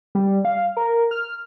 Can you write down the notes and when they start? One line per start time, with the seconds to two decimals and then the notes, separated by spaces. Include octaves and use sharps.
0.15 G3
0.45 F5
0.77 A#4
1.11 F6